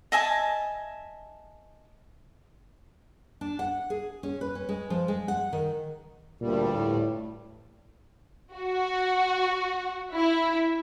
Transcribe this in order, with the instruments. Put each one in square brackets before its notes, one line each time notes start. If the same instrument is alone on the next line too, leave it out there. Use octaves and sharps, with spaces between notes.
[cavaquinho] D#5 E5 G#5 A5
[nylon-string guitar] D4
F#5
G#4
C#4
B4
C#4
G#3
F3
G#3
F#5
D#3
[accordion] D2 G2 G3 [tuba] A#2
[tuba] A2
[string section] F#4
E4